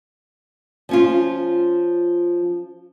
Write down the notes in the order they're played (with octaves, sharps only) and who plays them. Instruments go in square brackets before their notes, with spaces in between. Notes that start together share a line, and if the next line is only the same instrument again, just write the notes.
[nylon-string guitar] F3 C#4 F4